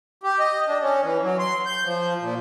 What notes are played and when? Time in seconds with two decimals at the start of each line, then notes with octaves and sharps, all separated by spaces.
0.23 G4
0.39 D#5
0.68 D4
0.82 C#4
1.03 E3
1.23 F#3
1.39 C6
1.66 G6
1.84 F3
2.21 A#2